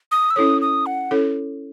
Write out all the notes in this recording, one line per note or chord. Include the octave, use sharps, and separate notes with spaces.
D#6
E6
C#4 E4 A4 C#5 D#6
D#6
F#5
C#4 E4 A4 C#5